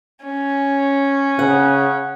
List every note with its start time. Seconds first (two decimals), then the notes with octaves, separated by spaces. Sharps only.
0.25 C#4
1.39 C#3 F#5